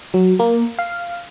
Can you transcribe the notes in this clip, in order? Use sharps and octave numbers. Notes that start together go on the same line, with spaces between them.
F#3
A#3
F5